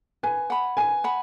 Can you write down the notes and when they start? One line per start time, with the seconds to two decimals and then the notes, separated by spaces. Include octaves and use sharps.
0.23 B4 G#5
0.50 F#5 B5
0.77 B4 G#5
1.04 F#5 B5